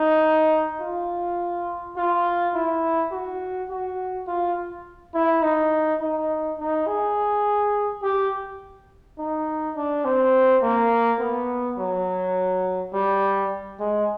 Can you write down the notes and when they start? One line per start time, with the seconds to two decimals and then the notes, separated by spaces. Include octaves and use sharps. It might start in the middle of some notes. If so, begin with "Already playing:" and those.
Already playing: D#4
0.81 F4
1.97 F4
2.54 E4
3.12 F#4
3.70 F#4
4.27 F4
5.14 E4
5.42 D#4
6.01 D#4
6.59 D#4
6.87 G#4
8.02 G4
9.19 D#4
9.76 D4
10.05 C4
10.63 A#3
11.20 B3
11.78 F#3
12.93 G3
13.80 G#3